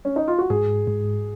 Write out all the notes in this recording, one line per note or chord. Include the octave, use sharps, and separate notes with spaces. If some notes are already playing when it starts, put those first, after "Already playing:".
C#4
D#4
F4
F#4
G#2 G#4
G#2